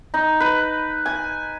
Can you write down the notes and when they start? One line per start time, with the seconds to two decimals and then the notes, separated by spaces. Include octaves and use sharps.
0.14 D#4
0.40 B4
1.06 G#5